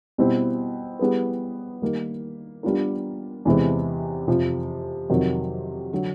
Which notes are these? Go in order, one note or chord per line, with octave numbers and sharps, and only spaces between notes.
B2 G3 C4 E4
G3 B3 E4 G#4 B4
D#3 G3 A#3 D#4
G3 B3 D4 F4 A#4
E2 C3 E3 G#3 C4
F2 C3 F3
F2 C3 D#3 F#3
D3 F#3